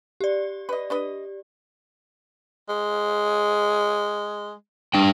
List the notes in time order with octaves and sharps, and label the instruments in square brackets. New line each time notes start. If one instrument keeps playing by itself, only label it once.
[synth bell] G4 D5
[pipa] B4 D#5
D4 B4 D#5
[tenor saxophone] G#3
[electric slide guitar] G3 D4 G5